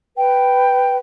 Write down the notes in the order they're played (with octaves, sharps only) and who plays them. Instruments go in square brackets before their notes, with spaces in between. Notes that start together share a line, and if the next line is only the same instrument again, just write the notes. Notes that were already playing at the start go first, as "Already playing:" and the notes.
[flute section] B4 G5